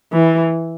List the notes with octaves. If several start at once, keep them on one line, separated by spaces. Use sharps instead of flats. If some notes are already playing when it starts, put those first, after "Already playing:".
E3